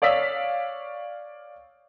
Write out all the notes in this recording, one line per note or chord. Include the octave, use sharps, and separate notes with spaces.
C#5 D5 F5 D#6 E6 B6